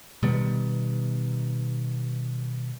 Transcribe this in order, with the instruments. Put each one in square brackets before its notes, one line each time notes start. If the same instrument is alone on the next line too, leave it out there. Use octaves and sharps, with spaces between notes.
[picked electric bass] B2 D#3 G3 B3